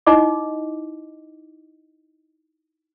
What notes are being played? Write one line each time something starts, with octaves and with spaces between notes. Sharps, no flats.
D#4 E4 D#5 D6